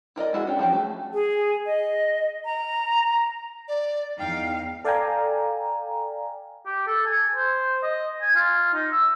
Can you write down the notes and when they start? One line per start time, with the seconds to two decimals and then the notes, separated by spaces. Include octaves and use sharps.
0.16 E4 A#4 D5 D#5
0.33 G#3 E4 F#4 G#4
0.47 C#4 D4 G4
0.59 F3 F#3 C#4 F#4 G4
0.73 A3 G#4
1.13 G#4
1.66 D#5
2.45 A#5
3.68 D5
4.19 E2 D#4 F5 G5
4.85 A4 D5 F5 G5 G#5 A#5
6.66 G4
6.87 A4
7.06 G#5
7.35 C5
7.84 D#5
8.22 G#5
8.36 F4
8.74 D#4
8.92 E6